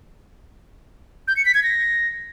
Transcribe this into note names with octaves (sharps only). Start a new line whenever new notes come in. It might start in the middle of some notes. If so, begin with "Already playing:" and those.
G6
C#7
B6
G#6
A#6